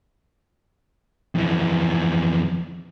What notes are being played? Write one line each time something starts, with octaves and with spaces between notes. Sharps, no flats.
F2 E3